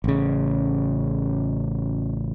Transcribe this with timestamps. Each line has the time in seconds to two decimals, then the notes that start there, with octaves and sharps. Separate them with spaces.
0.04 A1 C#3